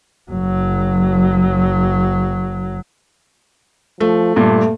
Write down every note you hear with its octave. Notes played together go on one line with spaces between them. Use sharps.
F#1 F#3
F3 A3
G2 A#2 A3